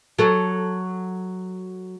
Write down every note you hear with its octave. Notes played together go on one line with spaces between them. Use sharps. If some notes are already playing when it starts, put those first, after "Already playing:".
F#3 A4